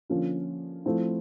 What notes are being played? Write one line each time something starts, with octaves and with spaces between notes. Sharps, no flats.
D3 F3 A#3 C#4 F4
F3 A3 C4 E4